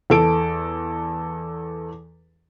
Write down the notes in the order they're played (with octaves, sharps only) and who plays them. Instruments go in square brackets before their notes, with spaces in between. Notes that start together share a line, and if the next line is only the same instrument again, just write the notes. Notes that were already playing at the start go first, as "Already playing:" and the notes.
[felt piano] E2 A4 D7